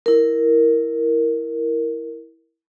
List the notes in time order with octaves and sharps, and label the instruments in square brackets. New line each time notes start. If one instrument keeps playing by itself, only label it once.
[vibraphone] E4 A#4